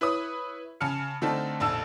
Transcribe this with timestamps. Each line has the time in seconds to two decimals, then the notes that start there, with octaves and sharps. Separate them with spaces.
0.01 E4 B4 C#5 D#6
0.81 C#3 G#5 A5 F6 C#7
1.22 D3 A3 C4 D#4 A4 A5
1.60 F1 A#1 A5 E6